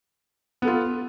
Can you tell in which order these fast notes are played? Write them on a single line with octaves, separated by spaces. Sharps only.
B3 A4 F4